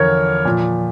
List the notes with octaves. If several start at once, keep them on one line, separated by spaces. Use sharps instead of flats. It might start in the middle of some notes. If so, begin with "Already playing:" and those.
Already playing: E2 D3 F3 A#4 C#5
A#2 F3